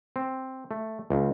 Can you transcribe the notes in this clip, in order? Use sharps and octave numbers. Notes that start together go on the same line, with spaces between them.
C4
A3
C#2